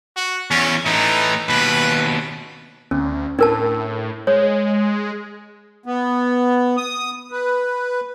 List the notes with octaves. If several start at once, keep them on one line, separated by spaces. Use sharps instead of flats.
F#4
E2 C#4
A2 E3 D#4
D#2 B2 B4
D2 C#4
A2 D4 A#4 A5
G#3 C#5
B3
D#6
B4